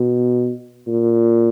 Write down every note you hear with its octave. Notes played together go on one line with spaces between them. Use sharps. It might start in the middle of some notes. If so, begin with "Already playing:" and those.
Already playing: B2
A#2